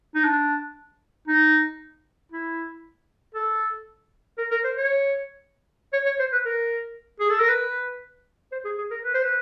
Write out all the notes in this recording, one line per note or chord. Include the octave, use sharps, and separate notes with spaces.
D#4
D4
D#4
E4
A4
A#4
A#4
C5
C#5
C#5
C#5
C5
B4
A#4
G#4
A4
A#4
B4
C5
G#4
G#4
A#4
B4
C5
B4